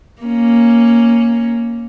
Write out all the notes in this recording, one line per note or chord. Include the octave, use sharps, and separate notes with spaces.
A#3 C#4